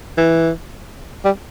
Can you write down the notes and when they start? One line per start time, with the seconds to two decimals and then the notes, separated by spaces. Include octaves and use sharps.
0.18 E3
1.25 G3